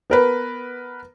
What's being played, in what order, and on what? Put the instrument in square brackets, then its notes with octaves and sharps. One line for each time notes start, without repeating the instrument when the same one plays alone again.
[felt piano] B3 A#4 B4